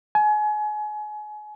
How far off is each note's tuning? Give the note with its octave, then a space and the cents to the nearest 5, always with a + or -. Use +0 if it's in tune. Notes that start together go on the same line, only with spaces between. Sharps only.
G#5 +30